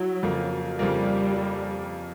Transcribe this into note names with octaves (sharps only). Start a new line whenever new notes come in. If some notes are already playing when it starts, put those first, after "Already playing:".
Already playing: F#3 E4
F2 C#3 F3 A#3
F2 C#3 F3 G3 A#3